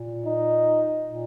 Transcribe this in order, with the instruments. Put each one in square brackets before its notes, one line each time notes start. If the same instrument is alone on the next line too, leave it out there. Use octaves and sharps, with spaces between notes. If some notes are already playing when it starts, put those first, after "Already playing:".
Already playing: [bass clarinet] A#2
[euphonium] D#4
[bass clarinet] A#2